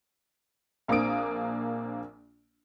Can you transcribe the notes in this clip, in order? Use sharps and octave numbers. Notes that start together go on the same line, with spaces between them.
A#1 A#3 C4 D4 D#6 D7